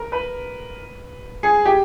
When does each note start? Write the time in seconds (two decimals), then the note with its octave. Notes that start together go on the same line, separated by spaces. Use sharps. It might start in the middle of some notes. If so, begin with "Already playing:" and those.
Already playing: A#4
0.12 B4
1.43 G#4
1.65 G4